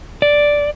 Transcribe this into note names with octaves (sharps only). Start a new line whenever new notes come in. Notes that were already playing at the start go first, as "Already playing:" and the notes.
D5